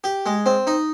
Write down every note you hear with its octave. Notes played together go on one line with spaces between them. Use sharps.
G4
G#3
C4
D#4